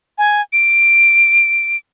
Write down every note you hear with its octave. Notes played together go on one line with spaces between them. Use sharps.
G#5
D7